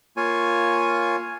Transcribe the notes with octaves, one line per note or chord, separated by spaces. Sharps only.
A#3 F4 C#5 G#5